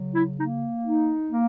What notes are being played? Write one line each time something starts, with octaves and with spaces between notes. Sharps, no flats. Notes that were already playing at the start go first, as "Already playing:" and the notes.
Already playing: C#3 F#3
E4
A#3 D#4
D#4
A#3